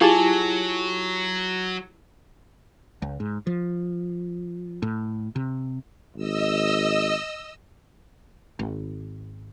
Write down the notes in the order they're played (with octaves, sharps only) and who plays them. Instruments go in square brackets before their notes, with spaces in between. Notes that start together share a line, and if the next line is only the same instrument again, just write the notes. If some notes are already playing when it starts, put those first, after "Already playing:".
[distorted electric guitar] F#3 [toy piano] E4 G4 G#4 [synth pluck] F4 G#5 A5
[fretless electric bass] C#2
G#2
F3
A2
C3
[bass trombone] G#1 [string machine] D#5 E6
[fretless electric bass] G#1